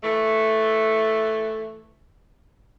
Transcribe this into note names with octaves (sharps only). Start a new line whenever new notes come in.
E3 A3